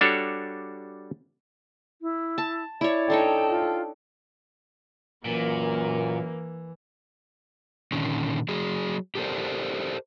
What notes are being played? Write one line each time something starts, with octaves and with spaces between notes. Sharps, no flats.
G3 D4 F#4 A4 C#5
E4
A5
E4 C#5 D5
D4 D#4 A4 C#5 G5
F4
F#2 A#2 E3 A#3
A#2 D3 D#3 C#4
F#3 G#4
G4 A4 A#4 C5 D5